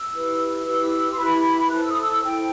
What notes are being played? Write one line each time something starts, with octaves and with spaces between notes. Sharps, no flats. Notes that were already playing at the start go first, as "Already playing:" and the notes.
Already playing: E6
E4 G4 B4
E4 G4 B4 E6
C6
E4 G4 B4 B5
E4 A4 C5 F#6
E6
D#6
E6
E4 A4 C5 G5